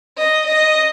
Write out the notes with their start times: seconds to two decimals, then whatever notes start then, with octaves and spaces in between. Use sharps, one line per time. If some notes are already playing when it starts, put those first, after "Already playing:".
0.17 D#5
0.47 D#5